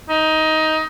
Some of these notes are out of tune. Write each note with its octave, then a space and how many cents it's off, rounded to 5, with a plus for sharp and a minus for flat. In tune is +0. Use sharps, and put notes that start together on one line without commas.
D#4 +15